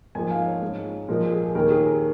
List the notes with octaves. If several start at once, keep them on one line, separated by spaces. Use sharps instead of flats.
G#2 F3 A#3 G#5
F5
C#5
G#2 G#3
A#2 F3 G#3 A#4
G#4
D#2 D#3 A#3 A#4
G#4
A#4